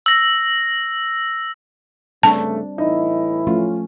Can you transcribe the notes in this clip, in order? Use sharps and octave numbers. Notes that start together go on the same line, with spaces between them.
E6 A#6
G2 C#3 G3 A3 C4 D4 A5
A2 E3 D#4 E4
F3 A3 C#4 F4